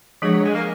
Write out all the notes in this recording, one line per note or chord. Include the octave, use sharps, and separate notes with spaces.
F3 F#3 G#3 D4 G#4
F#3
G#3
A#3